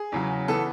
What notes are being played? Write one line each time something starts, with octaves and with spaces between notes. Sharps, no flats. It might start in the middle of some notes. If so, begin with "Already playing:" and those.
Already playing: G#4
E2 C#3 F#3
E3 B3 A4